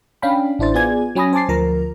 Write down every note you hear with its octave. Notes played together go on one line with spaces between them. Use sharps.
C#4 D4 F5 G5 B5
A1 D4 E4 C5 A6
B3 F4 G#4 D5 G#5 G#6
F#3 C#4 G#5 B5 D#6 A#6
C5 G#5 A5 D6 A6 C7
D2 F3 A#4 A#5